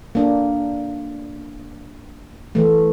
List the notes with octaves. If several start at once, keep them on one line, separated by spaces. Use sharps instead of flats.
A#3 D4
E3 A3